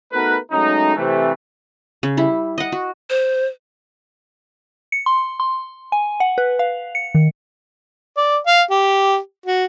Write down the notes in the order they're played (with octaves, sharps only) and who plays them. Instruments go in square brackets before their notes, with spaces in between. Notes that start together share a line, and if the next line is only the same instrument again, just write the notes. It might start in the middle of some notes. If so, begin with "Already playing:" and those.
[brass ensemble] A3 B3 D#4 F#4 A#4 B4
F#3 G#3 A3 C#4 D#4
C3 E3 A3
[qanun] C#3
G3 E4
D#5 F#5
F#4
[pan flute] C5
[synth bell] C#7
C6
C6
G#5
F#5
B4
F5
C#7
D#3
[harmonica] D5
F5
G4
F#4